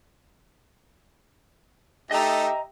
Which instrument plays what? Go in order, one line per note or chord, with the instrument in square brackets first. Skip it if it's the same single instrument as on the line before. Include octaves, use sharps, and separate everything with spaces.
[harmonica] A3 D#4 A4 [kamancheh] G4 E5 [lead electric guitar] D#5 A#5